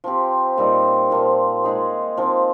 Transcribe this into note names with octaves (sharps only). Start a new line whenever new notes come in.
F3 C4 G4
A#2 G3 C4 D#4
A#2 F3 A#3
G#3 D#4 G#4
F3 C4 D#4